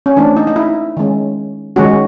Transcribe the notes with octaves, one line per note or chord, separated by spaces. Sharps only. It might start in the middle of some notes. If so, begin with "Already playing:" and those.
C#4
E3 A3 C4 D4
D#4
D#4
E4
D#3 G#3 C#4
D#3 G#3 C#4 F#4